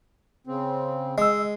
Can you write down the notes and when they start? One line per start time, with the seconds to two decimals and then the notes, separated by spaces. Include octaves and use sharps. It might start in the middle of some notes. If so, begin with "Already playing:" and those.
0.47 C#3 C4
1.18 G#3 D#5 E6